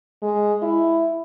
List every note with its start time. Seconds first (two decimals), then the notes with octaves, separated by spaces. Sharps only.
0.23 G#3
0.62 E4